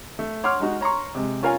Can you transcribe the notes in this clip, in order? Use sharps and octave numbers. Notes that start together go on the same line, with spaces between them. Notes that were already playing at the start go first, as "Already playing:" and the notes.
A3
C#5 F#5 C6 D6 F6
G#3 D#4 F#4
C#5 A#5 C6 C#6
C3 G#3
C#4 F4 A#4 F5 G#5